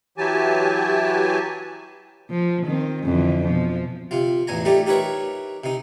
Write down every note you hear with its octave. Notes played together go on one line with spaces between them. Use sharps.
E3 F#3 G4 G#5 A5
F3
D#3 C4
F2 D3 E3
B2 F3
C3 F4
A1 E2 G#5 A#5
G3 A3 D#4 G4
D#4 G4 A#4 B4 C#5 E5
C3 D#4